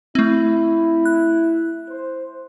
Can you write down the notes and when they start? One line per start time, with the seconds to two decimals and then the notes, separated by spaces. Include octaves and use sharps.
0.15 A3 C4 E4
1.05 F#6
1.88 C5